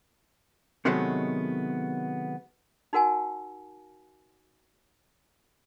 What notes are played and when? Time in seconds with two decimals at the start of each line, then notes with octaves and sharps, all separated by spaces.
0.85 C3 D#3 F#3 G#3 A3 B3
2.93 D#4 F#4 A#4 F#5 G#5 A5